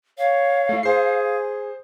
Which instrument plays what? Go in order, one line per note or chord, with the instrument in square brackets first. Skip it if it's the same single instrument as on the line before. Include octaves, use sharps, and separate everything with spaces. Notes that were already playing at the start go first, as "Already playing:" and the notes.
[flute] C#5 [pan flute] F5
[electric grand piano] A3 E4
[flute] G#4 [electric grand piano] C5 C7